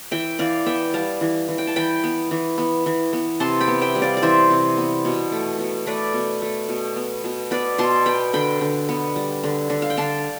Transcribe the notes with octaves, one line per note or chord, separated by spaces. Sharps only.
E3 E5 G5
E3 D5 F5
B3 E5 G5
G3 F5 A5
E3
E3
G5
A5
E3 G5 B5
B3
E3
B3
E3
B3
C3 A5 C6
G5 B5
B3
E5 G5
G3
D5 F5
D5
E3 C5 E5
C3
B3
B2
A3
B2
A3 B4 D5
B2
A3
B2
B3
B2
B3 B4 D5
B2 A5 C6
B3 G5 B5
D3 G5 B5
D3
B3
G3
D3
D3
F5
G5
D3 F5 A5